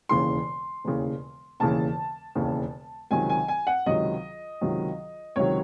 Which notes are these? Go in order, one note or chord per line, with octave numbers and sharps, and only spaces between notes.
E1 D#2 C#3 E3 C6
E1 D#2 C#3 E3
E1 D#2 C#3 E3 A5
E1 D#2 C#3 E3
C#2 C3 D#3 F#3 G#5
G#5
G#5
F#5
C#2 C3 D#3 F#3 D#5
C#2 C3 D#3 F#3
C#2 C3 D#3 F#3 C#5